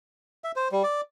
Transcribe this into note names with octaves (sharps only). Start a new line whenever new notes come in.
E5
C5
G3
D5